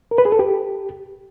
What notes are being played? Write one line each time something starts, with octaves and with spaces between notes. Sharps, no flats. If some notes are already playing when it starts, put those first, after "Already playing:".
A#4
B4
G#4
A4
G4